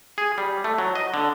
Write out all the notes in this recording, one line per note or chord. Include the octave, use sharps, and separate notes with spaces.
G#4
G3
A3
F#3
D#5
D3